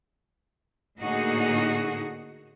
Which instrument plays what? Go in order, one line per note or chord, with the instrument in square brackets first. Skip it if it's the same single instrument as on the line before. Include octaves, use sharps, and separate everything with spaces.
[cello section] A2 D3 A#3 D#4 F#4 G#4